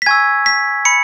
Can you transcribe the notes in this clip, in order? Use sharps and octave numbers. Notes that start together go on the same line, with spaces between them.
B6
G#5 C#6 E6 G#6
B6
B5 C#7